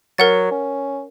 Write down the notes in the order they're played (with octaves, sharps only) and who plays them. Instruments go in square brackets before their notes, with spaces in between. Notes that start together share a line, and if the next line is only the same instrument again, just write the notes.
[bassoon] F#3 [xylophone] A#4 F#5 A6
[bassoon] C#4